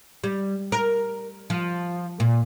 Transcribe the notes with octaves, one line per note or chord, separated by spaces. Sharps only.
G3
A#4
F3
A#2